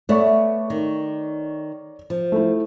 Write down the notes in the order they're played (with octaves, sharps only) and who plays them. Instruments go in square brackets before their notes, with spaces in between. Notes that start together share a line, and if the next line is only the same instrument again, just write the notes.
[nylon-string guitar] A3 B3 [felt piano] C#5 D5 C#6
[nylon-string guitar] D#3
F3
[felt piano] A3 E4